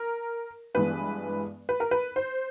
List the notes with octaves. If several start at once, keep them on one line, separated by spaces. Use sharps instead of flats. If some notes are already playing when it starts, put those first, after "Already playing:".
Already playing: A#4
G2 E3 G#3 B3 B4
B4
A#4
B4
C5